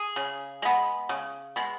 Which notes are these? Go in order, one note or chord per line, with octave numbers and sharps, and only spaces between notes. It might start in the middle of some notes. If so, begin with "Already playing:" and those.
Already playing: G#4
C#3
G#3 B3
C#3
G#3 B3